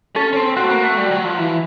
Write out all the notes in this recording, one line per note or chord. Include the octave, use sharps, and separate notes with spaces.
C#4 A4
C#4
C4
C4 F#4
A3
A#3
A3
G3
F#3
F3
E3